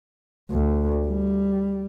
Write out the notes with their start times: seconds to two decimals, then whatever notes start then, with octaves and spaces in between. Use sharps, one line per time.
0.51 D2
1.07 G3